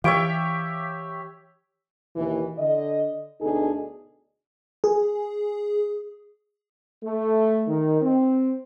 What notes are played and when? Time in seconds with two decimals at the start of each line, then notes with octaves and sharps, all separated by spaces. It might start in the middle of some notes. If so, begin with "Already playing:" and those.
0.04 E3 G4 C#5 E5 F5 D7
2.16 D#2 B2 E3
2.59 D3 D#5
3.41 D2 B2 D4 D#4 G#4 A4
4.84 G#4
7.04 A3
7.68 D#3
8.02 C4